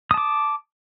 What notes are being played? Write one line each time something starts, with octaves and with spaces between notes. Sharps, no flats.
A5 D6 D#6